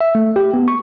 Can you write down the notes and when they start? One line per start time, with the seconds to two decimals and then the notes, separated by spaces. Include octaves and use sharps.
0.01 E5
0.15 A3
0.36 G4
0.54 B3
0.68 C#6